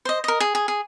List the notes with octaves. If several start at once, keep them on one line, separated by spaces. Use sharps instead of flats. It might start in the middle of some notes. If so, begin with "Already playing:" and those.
C5 D#5
A#4 D#5
G#4
G#4
G#4